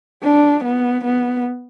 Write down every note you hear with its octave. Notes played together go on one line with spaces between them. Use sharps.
D4
B3
B3